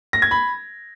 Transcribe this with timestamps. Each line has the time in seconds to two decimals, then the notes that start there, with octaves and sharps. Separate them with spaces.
0.13 A#6
0.22 G#6
0.31 B5